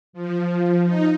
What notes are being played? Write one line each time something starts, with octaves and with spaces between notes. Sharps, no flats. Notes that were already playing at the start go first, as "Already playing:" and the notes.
F3
D#4